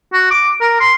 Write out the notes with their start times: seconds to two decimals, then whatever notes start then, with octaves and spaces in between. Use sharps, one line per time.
0.13 F#4
0.31 D6
0.61 A#4
0.80 C6